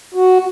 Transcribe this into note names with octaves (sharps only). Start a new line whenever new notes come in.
F#4